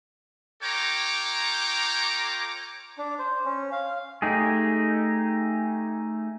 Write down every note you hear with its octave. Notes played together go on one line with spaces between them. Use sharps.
F4 A4 C#5 G5 A#5 D6
D4
C5
C#4
F5
A3 D#4 G4 G#4